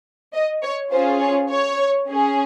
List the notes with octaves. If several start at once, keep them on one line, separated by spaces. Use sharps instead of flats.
D#5
C#5
C#4 F4 G#4 C5
C#5
C#5
C#4 G#4